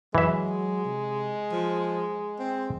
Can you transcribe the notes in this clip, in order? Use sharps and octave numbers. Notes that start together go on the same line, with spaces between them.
E3 F#3 G#3 E5
C3
F3
C4